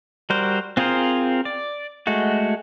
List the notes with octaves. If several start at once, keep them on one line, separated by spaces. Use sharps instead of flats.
G3 F#4 A#4 C5
C4 F4 G#4 A#4 C5
D5
G#3 A3 F#4